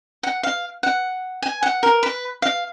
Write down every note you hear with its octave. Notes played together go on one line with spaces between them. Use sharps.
F#5
F5
F#5
G#5
F#5
A#4
B4
F5